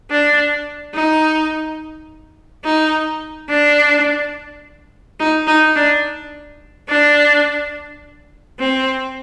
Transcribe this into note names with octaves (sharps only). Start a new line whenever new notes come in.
D4
D#4
D#4
D4
D#4
D#4
D4
D4
C4